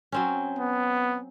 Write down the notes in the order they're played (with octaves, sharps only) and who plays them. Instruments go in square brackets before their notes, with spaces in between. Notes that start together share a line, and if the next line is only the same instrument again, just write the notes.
[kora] F#3 C4 C#4
[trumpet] B3